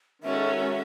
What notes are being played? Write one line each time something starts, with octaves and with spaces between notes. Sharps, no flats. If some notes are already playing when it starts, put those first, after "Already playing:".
D#3 G#3 C#4 F#4 A4 E5